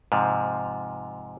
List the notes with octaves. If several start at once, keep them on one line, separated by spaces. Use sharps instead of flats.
G#2 C3 F3